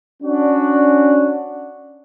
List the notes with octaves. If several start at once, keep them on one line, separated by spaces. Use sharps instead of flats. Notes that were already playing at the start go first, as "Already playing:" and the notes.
C#4 D4 F#4